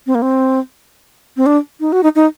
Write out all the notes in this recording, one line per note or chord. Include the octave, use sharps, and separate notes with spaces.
C4
A#3
C4
C4
D4
D#4
F#4
D#4
D#4